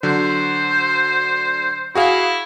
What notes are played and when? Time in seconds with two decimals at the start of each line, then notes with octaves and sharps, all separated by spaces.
0.03 D3 F#3 C5
1.95 E4 F#4 G#4 F5